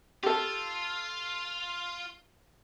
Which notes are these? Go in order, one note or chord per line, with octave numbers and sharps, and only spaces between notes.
F4 G4 A4